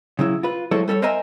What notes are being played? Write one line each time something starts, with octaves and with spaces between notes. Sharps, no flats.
C#3 F#3 E4
F4 B4
F#3 G#3 E4 A4 C5 C#5
G3 A4 A#4 C#5
A#4 C5 D#5 E5 G#5 A#5